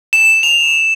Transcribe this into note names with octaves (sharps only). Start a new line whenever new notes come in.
E7
F7